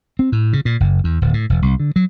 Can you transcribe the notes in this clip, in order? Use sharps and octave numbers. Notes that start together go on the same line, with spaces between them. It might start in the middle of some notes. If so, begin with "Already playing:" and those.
C4
A2
C#3
A#2
F#1
E2
D1
A2
E1
C2
D3
F#3